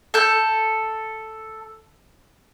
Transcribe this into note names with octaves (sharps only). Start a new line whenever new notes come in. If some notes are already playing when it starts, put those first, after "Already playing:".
A4 G6